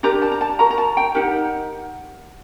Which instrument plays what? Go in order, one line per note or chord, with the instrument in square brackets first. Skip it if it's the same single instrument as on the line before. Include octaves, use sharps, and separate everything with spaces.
[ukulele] D4 G4 A#4 A#5
A5
A#5
A5
F#4 A#4 A#5
A#5
A5
G5
D#4 G4 A#4 F#5